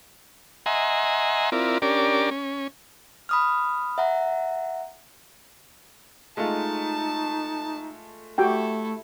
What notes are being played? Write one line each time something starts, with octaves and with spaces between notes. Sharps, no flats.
D#5 E5 F#5 G#5 A#5 C6
C4 E4 F4 A#4 D5
C#4 D4 G4 A#4 D5
C#4
B5 D#6 F6
E5 F#5 A#5
G#3 A3 D#4 F4 A5
A3 E4 F#4 G4 A4 G5